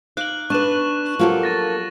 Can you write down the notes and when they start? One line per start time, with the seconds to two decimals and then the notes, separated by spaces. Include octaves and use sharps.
0.17 D#4 F5 D6 F#6 F#7
0.50 D4 B4 C#6 F#6 E7
1.19 F3 F#3 A#3 G4 A4
1.43 C#6 A6 A#6